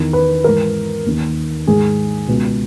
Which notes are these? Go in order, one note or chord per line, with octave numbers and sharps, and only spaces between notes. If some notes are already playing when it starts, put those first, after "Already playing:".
Already playing: E2 D#3
B4
G#2 E3 A#4
D#2 D#3
G#2 D#3 G#4
C#2 B2